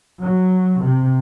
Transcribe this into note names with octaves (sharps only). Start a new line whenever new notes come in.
F#3
C3